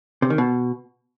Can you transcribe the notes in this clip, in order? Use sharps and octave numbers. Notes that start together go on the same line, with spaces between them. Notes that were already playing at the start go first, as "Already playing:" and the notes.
C3
D#3
B2